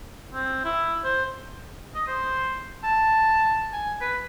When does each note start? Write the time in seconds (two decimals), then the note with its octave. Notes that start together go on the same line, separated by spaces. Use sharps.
0.34 C4
0.64 E4
1.04 C5
1.95 D#5
2.07 C5
2.83 A5
3.73 G#5
4.01 B4